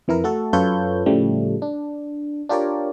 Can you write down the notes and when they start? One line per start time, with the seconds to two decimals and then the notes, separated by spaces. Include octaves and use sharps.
0.08 F2 E3 E4 A#4
0.24 A3 F#4 A4
0.53 F#2 F4 A4 B4 C#5 G6
1.06 A2 C#3 F3 G3 A3
1.62 D4
2.49 D4 F4 G4 A#4 C#5 D5